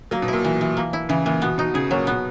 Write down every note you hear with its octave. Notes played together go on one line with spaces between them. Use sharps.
F#3 A#3
B2
A#2 E4
E3
E3
A#3
E4
C#3 E3
A#2 E3
B2 B3
B2 D#4
C#3 G#4
A#2 F#3
B2 B3